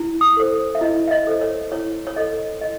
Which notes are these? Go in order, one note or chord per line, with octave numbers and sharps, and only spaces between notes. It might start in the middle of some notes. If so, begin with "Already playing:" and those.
Already playing: E4
D#6
A4 C5
E5
E4 D#5
E5
D#5
A4 C5
C#5
E4 C#5
C#5
A4 C5 D#5
E4 D#5